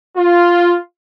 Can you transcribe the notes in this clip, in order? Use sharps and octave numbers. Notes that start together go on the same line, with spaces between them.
F4